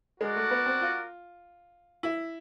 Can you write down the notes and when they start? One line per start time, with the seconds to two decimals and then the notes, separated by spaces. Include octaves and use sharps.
0.21 G#3 F#4 A#4 D5 F#5
0.36 A3
0.51 B3
0.66 C4
0.81 F4
2.03 E4